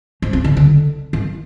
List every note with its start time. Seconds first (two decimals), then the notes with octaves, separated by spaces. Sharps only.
0.22 F3
0.33 C4
0.44 D3
0.57 D3
1.13 D#3